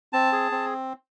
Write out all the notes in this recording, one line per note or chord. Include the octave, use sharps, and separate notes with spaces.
C4 A5
G#4
C4